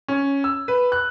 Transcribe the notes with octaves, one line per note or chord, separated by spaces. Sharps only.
C#4
E6
B4
F#6